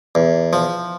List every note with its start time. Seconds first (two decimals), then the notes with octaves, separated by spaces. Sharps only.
0.15 E2
0.53 F3